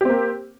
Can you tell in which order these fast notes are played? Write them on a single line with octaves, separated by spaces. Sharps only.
G4 C4 A#3